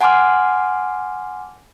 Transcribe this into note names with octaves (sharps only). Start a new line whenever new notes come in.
F#5 G#5 A5 C6 D6 F6